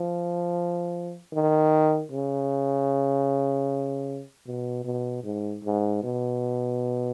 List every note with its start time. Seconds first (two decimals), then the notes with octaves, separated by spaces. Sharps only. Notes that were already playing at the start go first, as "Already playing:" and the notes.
Already playing: F3
1.32 D#3
2.12 C#3
4.46 B2
4.84 B2
5.24 G#2
5.64 G#2
6.03 B2